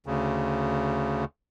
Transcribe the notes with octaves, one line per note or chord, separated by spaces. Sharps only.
D2 C#3